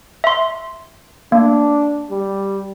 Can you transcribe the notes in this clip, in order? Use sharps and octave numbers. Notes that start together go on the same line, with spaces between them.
E5 C6
A#3 D4
G3